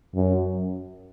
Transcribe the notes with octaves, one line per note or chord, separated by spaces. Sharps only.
F#2